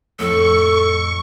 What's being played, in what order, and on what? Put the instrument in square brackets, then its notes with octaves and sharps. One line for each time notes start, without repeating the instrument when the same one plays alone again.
[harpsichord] F2 A2 [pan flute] A4 [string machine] C#6